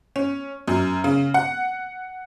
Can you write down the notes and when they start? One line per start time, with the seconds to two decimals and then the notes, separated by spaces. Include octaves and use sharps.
0.16 C#4
0.68 F#2
1.04 C#3
1.34 F#5